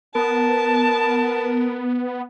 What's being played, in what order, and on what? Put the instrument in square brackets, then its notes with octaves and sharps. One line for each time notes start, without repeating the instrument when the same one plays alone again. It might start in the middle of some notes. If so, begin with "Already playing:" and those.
[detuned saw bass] B3 [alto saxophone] A#4 [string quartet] A5